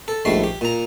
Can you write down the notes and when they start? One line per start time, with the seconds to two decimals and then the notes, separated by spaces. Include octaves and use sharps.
0.08 A4
0.25 A#1 G#2 G3 A3 C6
0.43 G4
0.61 A#2 A#5